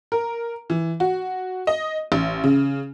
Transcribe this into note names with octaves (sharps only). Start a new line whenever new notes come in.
A#4
E3
F#4
D#5
A1
C#3